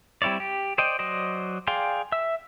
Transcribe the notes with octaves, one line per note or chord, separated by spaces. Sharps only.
G3 C4 E4 C#5 D5
G4
C5 D5 D#5 G5
F#3 C5 D5 D#5
G#4 D5 F5 G5 C6
E5 E6